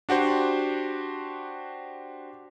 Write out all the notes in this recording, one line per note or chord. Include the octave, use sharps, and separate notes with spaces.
D4 F#4 G4 C5